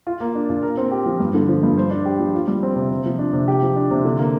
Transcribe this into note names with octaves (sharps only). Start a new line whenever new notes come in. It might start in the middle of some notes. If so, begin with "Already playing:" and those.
F4
A#3
D4
A#2
A#4
C4
G4
F3
G2
D3
F3
G2
C5
D4
G4
F3
F4
G3
C4
C3
C3
F3
D4
C3
G4
F3
D4
C3
D3
A#3